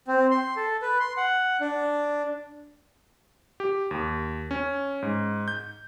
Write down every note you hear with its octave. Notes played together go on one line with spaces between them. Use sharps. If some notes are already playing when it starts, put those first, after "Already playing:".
C4
C6
A4
B4
C6
F#5
D4
G4
D#2
C#4
G#2
G6